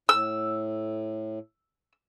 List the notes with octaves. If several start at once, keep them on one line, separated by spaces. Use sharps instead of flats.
A2 E6